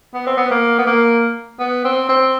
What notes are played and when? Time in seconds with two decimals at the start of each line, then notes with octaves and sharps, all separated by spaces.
0.14 B3
0.27 C4
0.37 B3
0.51 A#3
0.79 B3
0.87 A#3
1.59 B3
1.85 C4
2.09 C4